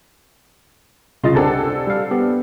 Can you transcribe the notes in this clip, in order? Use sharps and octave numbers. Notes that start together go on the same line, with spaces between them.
C2 C#3 F4 D#5 C6 A6
C4 D4 G4 A4 F#5 G#5
G3 F5
B3 G4